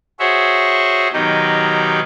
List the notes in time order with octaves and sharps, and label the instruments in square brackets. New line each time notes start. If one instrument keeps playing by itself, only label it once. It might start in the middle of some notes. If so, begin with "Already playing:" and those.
[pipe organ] F#4 G#4 C5 C#5 E5
B2 D#3 F#3 D#4 G4